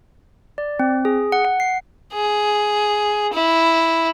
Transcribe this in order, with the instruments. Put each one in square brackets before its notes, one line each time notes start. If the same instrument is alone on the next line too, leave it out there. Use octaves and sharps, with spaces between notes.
[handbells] D5
C4
G#4
F#5
F#5
C7
[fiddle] G#4
E4